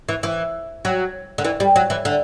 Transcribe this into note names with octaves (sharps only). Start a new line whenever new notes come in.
E3
E3
F#3
D3
E3
G3
F#3
E3
D3